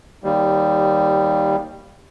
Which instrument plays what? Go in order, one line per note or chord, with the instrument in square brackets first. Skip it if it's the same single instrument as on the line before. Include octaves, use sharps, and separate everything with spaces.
[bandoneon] D#2 G3